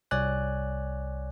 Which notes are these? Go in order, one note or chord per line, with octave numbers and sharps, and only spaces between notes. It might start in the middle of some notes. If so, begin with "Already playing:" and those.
C2 C#5 D5 G#5 F#6